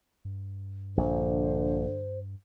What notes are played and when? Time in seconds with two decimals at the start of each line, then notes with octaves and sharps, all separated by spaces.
0.25 G2
0.97 A#1 D3 C5